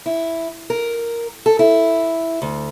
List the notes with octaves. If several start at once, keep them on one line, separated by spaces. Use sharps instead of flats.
E4
A#4
A4
E4
D2